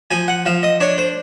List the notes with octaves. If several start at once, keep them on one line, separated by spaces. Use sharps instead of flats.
F3 G#5
F#5
F3 F5
D#5
D4 C#5
C5